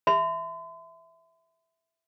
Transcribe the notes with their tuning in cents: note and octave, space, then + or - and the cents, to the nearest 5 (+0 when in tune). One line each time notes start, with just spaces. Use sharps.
E5 +0 C6 -45